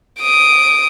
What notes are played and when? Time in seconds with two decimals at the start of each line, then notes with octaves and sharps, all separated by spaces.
0.21 D#6 D7